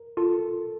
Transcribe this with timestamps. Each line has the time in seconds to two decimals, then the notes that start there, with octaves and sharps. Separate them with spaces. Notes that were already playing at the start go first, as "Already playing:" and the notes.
Already playing: A#4
0.17 F4 A4